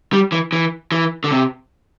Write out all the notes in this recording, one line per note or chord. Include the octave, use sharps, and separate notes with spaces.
G3
E3
E3
E3
D3
C3